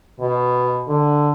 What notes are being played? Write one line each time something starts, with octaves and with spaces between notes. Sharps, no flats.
B2
D3